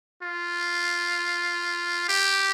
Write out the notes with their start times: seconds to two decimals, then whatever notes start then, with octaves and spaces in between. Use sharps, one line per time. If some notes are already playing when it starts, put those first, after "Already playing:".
0.23 F4
2.09 G4